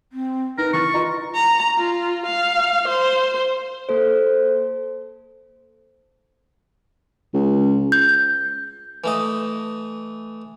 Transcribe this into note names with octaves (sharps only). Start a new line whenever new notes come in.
C4
D#4 A#4 B4
E3 C#6 A6
F4 D#5 A#5
A#5
F4
F5
C5
A#3 A4 C5
C#2
G6
E3 A3 D#5